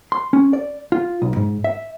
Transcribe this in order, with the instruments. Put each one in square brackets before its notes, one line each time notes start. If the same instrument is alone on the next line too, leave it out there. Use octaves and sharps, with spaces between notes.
[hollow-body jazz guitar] C6
C#4
D5
F4
B1
G#2
E5